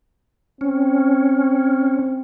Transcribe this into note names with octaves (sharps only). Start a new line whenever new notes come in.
C4 C#4